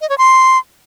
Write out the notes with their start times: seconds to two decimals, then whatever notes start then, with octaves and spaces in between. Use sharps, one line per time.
0.01 D#5
0.10 C#5
0.18 C6